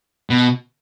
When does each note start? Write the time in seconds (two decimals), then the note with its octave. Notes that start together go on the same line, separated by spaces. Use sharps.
0.30 B2